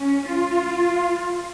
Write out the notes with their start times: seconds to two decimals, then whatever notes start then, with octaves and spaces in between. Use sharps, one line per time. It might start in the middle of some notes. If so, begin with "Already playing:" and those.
Already playing: C#4
0.30 F4